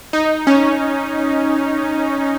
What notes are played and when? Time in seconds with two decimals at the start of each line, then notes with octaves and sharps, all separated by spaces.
0.13 D#4
0.47 C#4